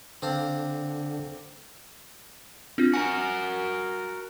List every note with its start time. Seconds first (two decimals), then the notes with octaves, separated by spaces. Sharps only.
0.22 D3 C4 D4 F5
2.78 C4 D4 F4
2.94 F#4 A#4 G#5